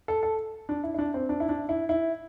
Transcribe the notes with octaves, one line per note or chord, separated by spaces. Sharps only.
A4
A4
D4
E4
E4
D4
C4
D4
E4
D4
E4
E4